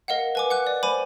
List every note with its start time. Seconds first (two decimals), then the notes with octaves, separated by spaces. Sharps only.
0.08 A#4 D#5 F5 F#5
0.35 B4 G#5 D6
0.50 F#5 D6 F#6
0.67 D5
0.83 C5 G#5 B5 D6 D#7